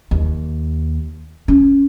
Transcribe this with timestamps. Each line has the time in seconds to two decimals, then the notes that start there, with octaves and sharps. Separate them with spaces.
0.11 D#2
1.48 C#4